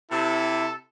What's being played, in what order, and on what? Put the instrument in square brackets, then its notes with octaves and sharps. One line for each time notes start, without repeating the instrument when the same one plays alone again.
[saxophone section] C3 [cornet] E4 [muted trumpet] A4